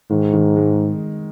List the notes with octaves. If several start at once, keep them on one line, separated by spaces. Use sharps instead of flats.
G#2 D#3
D#3
G#3